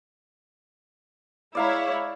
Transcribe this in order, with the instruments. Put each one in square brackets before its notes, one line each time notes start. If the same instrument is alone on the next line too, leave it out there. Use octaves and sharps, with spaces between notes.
[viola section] G#3 E4 C#5 [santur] D5 F5 A#5